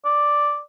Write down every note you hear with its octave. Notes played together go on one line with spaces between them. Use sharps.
D5